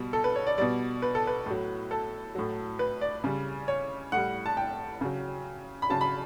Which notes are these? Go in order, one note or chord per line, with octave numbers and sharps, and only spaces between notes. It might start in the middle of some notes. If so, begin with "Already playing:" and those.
Already playing: B2 G3
A4
B4
C#5
D5
B2 G3 D5
B4
A4
B4
A2 F#3
A4
A2 F#3
B4
D5
C#3 G3
C#5
A2 G3 F#5
A5
G5
C#3 F#3
B5
C#3 F#3 A5
B5